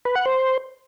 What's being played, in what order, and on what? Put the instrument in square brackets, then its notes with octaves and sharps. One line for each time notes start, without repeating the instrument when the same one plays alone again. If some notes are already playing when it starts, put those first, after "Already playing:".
[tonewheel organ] B4
F#5
C5